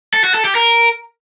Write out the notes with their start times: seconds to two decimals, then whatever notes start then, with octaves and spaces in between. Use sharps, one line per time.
0.14 A4
0.24 F#4
0.34 A4
0.45 G4
0.55 A#4